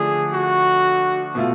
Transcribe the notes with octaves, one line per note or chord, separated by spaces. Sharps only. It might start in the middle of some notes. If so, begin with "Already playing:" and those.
Already playing: D3 F3 A3 D4 G#4
F#4
B2 A3 F4